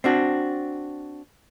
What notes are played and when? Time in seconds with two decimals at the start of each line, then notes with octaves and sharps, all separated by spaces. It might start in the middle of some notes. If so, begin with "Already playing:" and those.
0.04 C4 D4 F#4